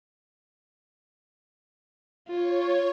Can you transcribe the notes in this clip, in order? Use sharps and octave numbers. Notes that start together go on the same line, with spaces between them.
F4 C#5